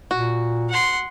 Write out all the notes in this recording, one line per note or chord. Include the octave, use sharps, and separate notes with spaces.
A#2 F#4
F#5 C6